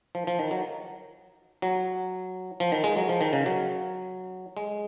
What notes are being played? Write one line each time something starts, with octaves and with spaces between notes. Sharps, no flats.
F3
F3
D#3
F#3
F#3
F3
D#3
G#3
F#3
F3
D#3
C#3
F#3
G#3